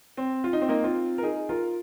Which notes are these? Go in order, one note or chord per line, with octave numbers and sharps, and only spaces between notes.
C4
F4
D#4
C4
A#3 D#4
C4 F4
A#4
D#4 G#4
F4 A#4